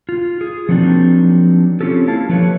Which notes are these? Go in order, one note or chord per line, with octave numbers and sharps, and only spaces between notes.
F4
G#4
F3 F#3 A#3 C4 D4 D#4
C4 C#4 F4 G4 A4
A#3 E4 F5 A5
F3 A3 G4 B4 C#5